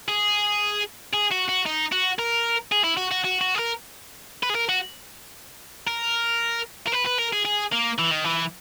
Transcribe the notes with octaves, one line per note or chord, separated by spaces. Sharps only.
G#4
G#4
F#4
F#4
D#4
F#4
A#4
G#4
E4
F#4
F#4
F#4
F#4
G#4
A#4
B4
G#4
A#4
F#4
A#4
A#4
B4
B4
A#4
G#4
G#4
A#3
E3
D#3
E3